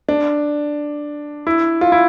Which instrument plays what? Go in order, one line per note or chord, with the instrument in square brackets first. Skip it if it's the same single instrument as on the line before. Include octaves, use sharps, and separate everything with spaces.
[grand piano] D4
E4
F4
E4